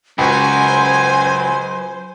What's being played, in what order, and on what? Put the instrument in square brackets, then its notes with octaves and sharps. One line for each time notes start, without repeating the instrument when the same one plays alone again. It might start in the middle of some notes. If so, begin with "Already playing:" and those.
[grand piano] C#2 F#4 [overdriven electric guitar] F#2 [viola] C5 [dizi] G#5